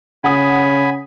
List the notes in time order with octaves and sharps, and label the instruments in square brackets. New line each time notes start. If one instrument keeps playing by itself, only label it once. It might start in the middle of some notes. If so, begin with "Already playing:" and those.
[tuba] C#3 [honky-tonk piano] F#5 D#6 [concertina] G#5 B5